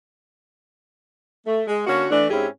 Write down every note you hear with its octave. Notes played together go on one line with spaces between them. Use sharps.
A3
G#3
D3 A#3 C#4 F#4
E3 A3 D4
G#2 C4 C#4 E4 G4 G#4